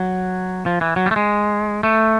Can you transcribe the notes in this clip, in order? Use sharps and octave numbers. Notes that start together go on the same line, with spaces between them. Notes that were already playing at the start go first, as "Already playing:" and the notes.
Already playing: F#3
F3
E3
F#3
G3
A3
G#3
A3